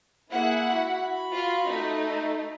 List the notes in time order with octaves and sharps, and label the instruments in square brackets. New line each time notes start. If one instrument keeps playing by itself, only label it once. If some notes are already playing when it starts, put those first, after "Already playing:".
[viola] A#3 G#4 [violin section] E4 F#5
[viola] F#4 B5
[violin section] F4
A3 D#4